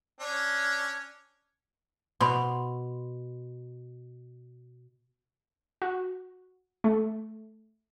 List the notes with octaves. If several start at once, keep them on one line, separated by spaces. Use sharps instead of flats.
C#4 D4
B2 B5 C6
F#4
A3